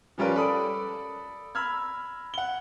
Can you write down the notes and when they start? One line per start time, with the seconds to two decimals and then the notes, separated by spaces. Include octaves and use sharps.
0.18 F3 G3 C#4 F4 A#4 B4
0.36 A4 D5 B5 D#6
1.55 A#5 B5 E6 F6 G#6
2.34 F#5 G7